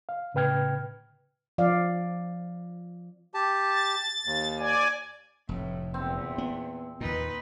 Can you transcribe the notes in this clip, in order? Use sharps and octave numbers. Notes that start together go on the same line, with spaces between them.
F5
A2 C#3 B4 G5 F6 G#6
F3 D5 F5
G4 A5
A6
D#2
D5 G#5
F1 A2
E2 A#2 C4
B3
D#2 A#2 D#4 B4